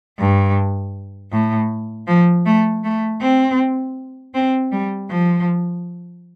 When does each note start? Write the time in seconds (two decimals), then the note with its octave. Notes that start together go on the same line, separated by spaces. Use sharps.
0.19 G2
1.32 A2
2.08 F3
2.46 A3
2.84 A3
3.21 C4
4.34 C4
4.72 G3
5.10 F3